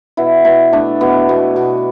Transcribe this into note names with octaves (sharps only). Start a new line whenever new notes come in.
B2 B3 E4
B2 B3 E4
A3 D4
B2 B3
B2
B2